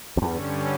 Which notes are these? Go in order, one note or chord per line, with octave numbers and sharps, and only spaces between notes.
F2
E2 G2 D3 G3 C#4